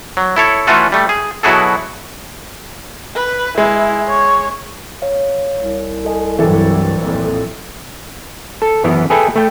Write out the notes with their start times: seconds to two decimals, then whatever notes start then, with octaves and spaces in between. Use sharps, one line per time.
0.17 F#3
0.36 E4 A4 C#5
0.67 E3 A3 C#4 F4 F#4 A4
0.92 G3 A3
1.09 G#4
1.43 B2 F#3 E4 F#4 G#4 A4
3.15 B4
3.58 G#3 E4
4.07 C#5
5.02 C#5 F5
5.54 C2
6.05 A4 D#5 G#5
6.39 G2 C3 E3 F#3 A4 B4 D5 G5
6.98 F2 A#2
8.62 A4
8.84 F#2 E3 B3 E4
9.10 G#4 A4 B4 E5 G5 G#5
9.36 A3 G5